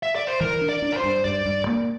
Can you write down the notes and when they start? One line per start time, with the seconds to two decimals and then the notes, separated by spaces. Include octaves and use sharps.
0.03 E5
0.15 D5
0.27 C5
0.41 E3 A#4
0.61 D4
0.69 D5
0.82 D4
0.92 A#4
0.97 C5
1.04 G2
1.24 G2 D5
1.46 G2
1.67 A#3